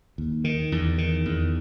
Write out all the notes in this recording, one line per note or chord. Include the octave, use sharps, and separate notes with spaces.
D#2
D#3
E2
D#3
E2